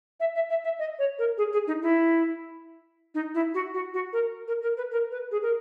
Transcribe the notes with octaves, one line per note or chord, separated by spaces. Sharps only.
E5
E5
E5
E5
D#5
C#5
A#4
G#4
G#4
D#4
E4
D#4
E4
F#4
F#4
F#4
A#4
A#4
A#4
B4
A#4
B4
G#4
A#4